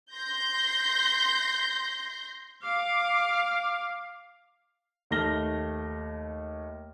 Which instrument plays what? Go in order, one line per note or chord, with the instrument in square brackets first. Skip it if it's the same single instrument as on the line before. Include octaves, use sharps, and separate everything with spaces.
[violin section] C6 G6 A#6
[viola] F5 [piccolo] D6
[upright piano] D#2 A3 F6 A#6 G7